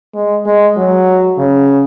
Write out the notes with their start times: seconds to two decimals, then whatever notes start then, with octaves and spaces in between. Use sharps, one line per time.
0.15 G#3
0.46 G#3
0.77 F#3
1.38 C#3